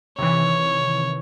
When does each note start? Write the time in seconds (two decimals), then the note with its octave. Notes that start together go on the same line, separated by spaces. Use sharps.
0.19 C3 D#3 E3 C#5